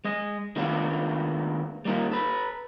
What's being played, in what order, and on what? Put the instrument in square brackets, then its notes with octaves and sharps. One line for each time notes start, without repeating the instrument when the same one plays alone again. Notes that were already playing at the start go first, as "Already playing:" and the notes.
[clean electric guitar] G#3 D#5
D#3 G#3 A3 B3 D4 F4
G3 A#3 C#4 D#4 F4
A4 B4